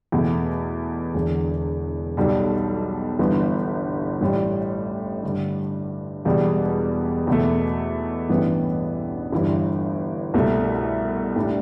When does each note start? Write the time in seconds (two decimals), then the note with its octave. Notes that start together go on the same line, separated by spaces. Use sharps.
0.12 E2 B2 A3
1.14 E1 E2 D3
2.17 B1 B2 G3
3.19 G1 G2 E3 B3
4.21 A1 A2 G3
5.23 G2 D3 G3
6.25 E1 E2 B2 G3
7.27 E2 B2 A3
8.29 A1 G2 E3 B3
9.32 G1 G2 E3 G3
10.34 C2 B2 A3
11.36 A2 G3 D4